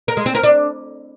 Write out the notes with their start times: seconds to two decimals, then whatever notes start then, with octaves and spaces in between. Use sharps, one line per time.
0.08 A#4
0.17 G#3
0.26 C4
0.35 A#4
0.43 D4